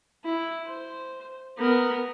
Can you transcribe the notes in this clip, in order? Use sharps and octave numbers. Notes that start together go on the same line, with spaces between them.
E4
C5
B3 A#4